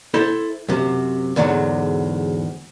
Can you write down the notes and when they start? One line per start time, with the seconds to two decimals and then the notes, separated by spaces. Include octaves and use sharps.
0.14 E4 A4 C5
0.69 F#2 C3
1.36 E2 G#2 D3 F#3